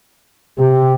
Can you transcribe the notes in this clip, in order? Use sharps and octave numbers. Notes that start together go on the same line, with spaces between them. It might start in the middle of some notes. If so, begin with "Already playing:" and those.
C3 G4